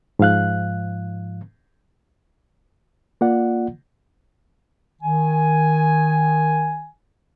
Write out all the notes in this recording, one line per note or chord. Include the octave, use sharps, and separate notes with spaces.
G#2 F3 F5 F#6
A#3 F4 D5 F#5
D#3 G#5